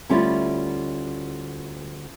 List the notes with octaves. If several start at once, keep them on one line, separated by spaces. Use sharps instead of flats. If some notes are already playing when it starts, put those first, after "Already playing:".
D2 G3 C#4 E4 F4 D5